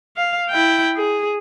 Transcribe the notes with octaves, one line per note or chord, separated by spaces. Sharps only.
F5
E4 G5
G#4